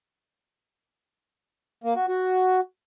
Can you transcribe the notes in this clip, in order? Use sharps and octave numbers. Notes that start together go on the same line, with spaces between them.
A#3
F#4
F#4